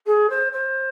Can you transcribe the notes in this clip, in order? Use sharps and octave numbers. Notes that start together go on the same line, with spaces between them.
G#4
C5
C5